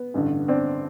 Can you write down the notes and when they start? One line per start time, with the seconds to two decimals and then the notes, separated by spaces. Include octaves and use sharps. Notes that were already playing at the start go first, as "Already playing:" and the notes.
Already playing: B3
0.14 A1 G2 D3
0.48 C4 D4